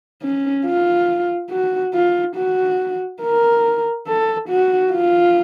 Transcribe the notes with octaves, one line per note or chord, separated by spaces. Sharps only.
C#4
F4
F#4
F4
F#4
A#4
A4
F#4
F4